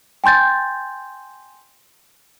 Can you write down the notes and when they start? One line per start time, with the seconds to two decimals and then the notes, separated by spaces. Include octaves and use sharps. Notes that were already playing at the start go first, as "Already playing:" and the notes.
0.24 G5 G#5 C6 G6 A6